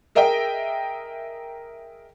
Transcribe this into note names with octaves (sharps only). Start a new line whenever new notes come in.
G#4 A#4 D#5 E5 G5